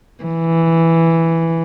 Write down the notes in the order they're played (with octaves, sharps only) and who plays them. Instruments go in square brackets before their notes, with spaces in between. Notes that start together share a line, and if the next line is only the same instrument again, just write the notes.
[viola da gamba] E3